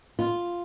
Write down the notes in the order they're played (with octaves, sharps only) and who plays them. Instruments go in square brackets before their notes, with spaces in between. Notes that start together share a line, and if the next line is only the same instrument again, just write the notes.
[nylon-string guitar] F4